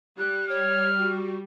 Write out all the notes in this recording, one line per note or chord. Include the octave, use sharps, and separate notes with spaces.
G3 F#6
C#5 F6
F#4